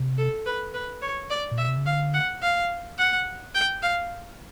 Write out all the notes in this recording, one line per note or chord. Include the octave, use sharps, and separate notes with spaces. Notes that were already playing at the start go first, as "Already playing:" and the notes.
Already playing: C3
A4
B4
B4
C#5
D5
A#2
B2 E5
C3
C#3
D3 F5
F#5
F5
F#5
G5
F5